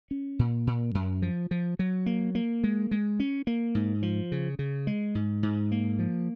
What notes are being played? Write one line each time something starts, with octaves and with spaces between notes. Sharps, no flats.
C#4
A#2
A#2
F#2
F3
F3
F#3
A#3
A#3
G#3
G#3
C#4
A#3
G#2
F3
C#3
C#3
G#3
G#2
G#2
A#3
F3